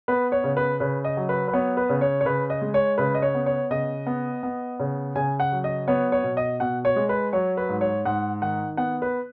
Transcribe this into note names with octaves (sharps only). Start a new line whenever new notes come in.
B3 B4
C#5
C#3
B4
C#3 B4
D#5
F#3
B4
B4
B3 C#5
B4
C#3
C#5
C#5
C#3 B4
D#5
G#3
C#5
C#3 B4
D#5
C#5
B3
C#5
C#3 D#5
B3
B3
C#3
C#3 G#5
F#5
F#3
D#5
B3 C#5
C#5
B2
D#5
B2 F#5
C#5
G#3
B4
F#3 C#5
B4
G#2
C#5
G#2 F#5
D#3 F#5
B3 F#5
B4